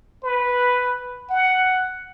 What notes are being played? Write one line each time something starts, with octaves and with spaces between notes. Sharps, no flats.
B4
F#5